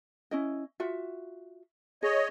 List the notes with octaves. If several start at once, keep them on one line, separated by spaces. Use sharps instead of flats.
C#4 E4 D#5
F4 F#4 E5
G#4 C#5 D#5